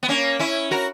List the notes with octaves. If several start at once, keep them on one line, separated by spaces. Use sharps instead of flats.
B3
A#3 C#4
C#4 E4
F#4 A#4